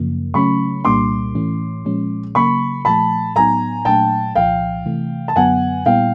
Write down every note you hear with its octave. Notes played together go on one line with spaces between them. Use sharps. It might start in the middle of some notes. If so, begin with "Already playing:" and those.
Already playing: F#2 C#3 F3 A#3
C#3 F#3 A3 C#4 B5 C#6
C2 A#2 G3 A#3 D4 C6 D6
A2 E3 A3 C#4
A#2 F3 G#3 C#4
C#3 F#3 A#3 B5 C#6
A#2 F3 A3 A5 B5
A2 F#3 B3 D#4 G#5 A#5
A#2 F#3 A3 D4 G5 A5
C2 A#2 F3 F5 G5
C3 E3 A3
A5
F#2 D3 F#3 B3 F#5 G#5
A#2 G3 B3 E4 F5 G5